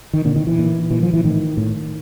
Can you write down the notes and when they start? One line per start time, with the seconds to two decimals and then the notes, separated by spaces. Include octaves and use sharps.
0.13 D#3
0.25 A#2 D3
0.36 D#3
0.47 E3
0.59 A#2
0.91 A#2 E3
1.03 F3
1.14 E3
1.24 A2 D#3
1.57 A2